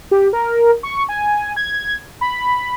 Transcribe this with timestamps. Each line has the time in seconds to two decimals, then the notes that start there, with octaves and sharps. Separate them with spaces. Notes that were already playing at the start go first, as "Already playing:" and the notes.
0.11 G4
0.33 A#4
0.83 C#6
1.09 G#5
1.56 G#6
2.21 B5